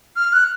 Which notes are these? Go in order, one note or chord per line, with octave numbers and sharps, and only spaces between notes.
F6
F#6